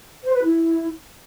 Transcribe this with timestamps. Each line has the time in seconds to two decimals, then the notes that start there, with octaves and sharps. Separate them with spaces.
0.23 C5
0.34 B4
0.44 E4